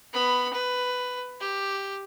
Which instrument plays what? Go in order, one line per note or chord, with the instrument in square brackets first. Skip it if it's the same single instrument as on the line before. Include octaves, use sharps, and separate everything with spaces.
[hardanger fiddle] B3 B5
B4
G4